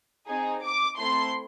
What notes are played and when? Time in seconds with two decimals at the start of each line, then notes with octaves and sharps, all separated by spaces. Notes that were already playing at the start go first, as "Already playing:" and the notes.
0.28 C4 D#4 G#4
0.63 D6
0.99 A3 C4 E4 A4 C6